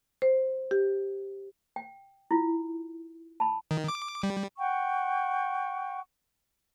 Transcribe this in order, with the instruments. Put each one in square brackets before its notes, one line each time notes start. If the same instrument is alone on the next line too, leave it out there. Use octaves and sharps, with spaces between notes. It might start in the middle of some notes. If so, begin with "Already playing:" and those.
[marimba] C5
G4
[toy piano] G5
E4 F4
A5 B5
[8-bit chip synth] D#3
D6
G3
[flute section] F#5 G5 C#6